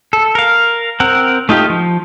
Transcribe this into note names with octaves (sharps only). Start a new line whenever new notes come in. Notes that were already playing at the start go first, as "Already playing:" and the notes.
A4
A#4 F5
C4 A#4 F#5
A3 D#4 F4 G4
F3